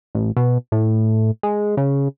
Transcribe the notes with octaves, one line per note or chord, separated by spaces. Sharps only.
A1
B2
A2
G#3
C#3